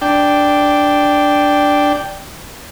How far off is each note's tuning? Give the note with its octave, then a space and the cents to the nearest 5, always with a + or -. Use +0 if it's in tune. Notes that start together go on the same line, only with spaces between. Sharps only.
D4 +0 G5 +0